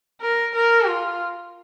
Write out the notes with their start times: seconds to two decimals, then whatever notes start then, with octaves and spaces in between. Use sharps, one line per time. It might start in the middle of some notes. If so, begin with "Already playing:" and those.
0.22 A#4
0.55 A#4
0.87 F4